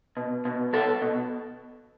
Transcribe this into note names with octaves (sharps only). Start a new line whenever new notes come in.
B2
B2
B2 A4
B2